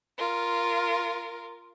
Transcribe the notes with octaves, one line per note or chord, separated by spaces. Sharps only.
F4 A#4